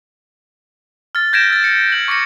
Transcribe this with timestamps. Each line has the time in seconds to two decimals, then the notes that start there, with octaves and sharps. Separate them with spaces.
1.15 F6 A6
1.33 G6 G#6 A#6 B6 D7 E7
1.50 E6 A6
1.64 C#7
1.92 G6 F#7
2.08 C#6 D6 A#6 C#7